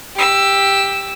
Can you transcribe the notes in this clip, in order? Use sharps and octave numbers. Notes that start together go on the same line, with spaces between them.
G4 E6